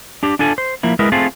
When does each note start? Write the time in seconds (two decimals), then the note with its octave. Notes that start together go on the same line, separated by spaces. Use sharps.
0.23 D4 G4
0.39 D4 F4 A4 G#5
0.58 C5
0.83 F3 A#3 E4
0.99 G#3 E4 A#4 B4 D#5
1.12 A3 C4 F4 G#4 A4